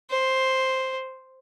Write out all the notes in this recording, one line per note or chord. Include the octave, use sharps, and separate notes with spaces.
C5